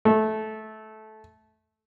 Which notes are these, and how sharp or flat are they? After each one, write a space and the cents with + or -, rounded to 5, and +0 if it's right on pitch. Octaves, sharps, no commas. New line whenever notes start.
A3 -15